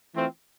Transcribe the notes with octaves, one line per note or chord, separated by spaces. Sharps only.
E3 A3 C4 F4